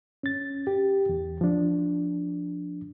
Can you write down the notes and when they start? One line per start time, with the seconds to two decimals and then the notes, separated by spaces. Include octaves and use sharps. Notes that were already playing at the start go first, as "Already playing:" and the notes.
0.23 C#4 A6
0.67 G4
1.09 E2
1.41 F3 D4